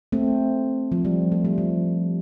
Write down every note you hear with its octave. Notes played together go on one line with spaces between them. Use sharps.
A3 C4
F3
G3
A3
G3
F3